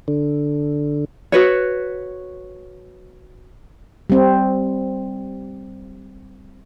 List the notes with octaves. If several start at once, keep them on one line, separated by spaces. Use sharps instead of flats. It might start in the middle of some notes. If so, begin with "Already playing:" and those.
D3
F#4 B4 C#5
G3 C4